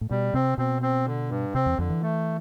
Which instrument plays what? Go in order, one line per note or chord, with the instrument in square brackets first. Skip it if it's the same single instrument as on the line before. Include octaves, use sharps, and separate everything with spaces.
[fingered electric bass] A2
[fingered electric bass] B2 [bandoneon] G3
[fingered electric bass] C3 [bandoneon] C4
[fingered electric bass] B2 [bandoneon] C4
[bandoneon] C4
D3
G2
[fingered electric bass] C3 [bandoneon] C4
[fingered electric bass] E2
[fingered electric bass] F2 [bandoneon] D3
[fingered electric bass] E3
[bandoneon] A3